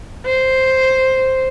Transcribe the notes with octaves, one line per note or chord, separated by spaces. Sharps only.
C5